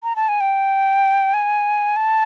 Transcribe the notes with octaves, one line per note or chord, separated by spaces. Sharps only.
A#5
A5
G#5
G5
G#5
A5